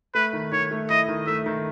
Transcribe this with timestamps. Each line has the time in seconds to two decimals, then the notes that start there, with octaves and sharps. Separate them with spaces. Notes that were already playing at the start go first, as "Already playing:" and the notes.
0.15 A3 B4
0.33 D#3
0.52 D#3 C#5
0.71 A3
0.90 E4 D#5
1.08 D#3
1.27 A3 E5
1.46 D#3